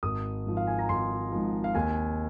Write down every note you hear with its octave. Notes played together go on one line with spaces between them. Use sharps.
G#1 D#6
G#2 F3
F5
G#5
A#5
G#1 C6
G#2 F3
F5
D#2 G#5